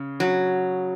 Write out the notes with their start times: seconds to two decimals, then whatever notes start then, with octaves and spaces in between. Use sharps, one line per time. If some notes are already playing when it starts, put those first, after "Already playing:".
Already playing: C#3
0.20 F#3